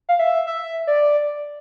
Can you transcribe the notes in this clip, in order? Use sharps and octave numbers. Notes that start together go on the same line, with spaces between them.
F5
E5
E5
D5